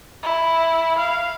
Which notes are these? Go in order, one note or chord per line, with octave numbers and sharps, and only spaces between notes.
E4
F5